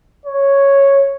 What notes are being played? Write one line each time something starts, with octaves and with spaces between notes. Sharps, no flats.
C#5